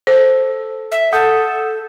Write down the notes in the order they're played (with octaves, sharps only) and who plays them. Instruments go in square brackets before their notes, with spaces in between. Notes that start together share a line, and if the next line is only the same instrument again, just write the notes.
[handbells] A4 [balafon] C5
[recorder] E5
[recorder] A4 [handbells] F#5 D#6 G6